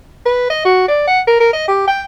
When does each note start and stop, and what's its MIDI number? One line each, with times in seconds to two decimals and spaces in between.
0.25 0.48 71
0.50 0.64 75
0.65 0.85 66
0.88 1.05 74
1.07 1.20 78
1.27 1.39 70
1.40 1.52 70
1.53 1.66 75
1.68 1.83 67
1.87 2.02 79